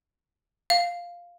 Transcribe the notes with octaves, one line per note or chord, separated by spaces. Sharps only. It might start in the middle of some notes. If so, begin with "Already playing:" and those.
F5